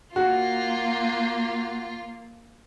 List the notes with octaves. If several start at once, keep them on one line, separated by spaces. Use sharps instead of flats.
A#3 F4 F#4